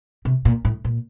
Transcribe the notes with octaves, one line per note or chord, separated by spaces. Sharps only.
C3
A#2
A2
A#2